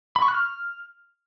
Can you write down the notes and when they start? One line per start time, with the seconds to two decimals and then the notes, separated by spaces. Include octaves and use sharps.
0.16 B5
0.22 C#6
0.28 F#6
0.34 F6